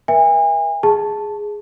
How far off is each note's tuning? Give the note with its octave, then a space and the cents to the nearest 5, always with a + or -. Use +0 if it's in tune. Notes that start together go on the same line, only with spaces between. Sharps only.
A#4 +45 E5 +0 G#5 -40
G#4 +0 A5 +0